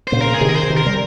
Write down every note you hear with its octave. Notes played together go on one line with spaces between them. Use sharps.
A#2 C#3 C5
A#4
G#4
C3 D#3
A#4
C5
C#3
C3 D#3
A#4
G3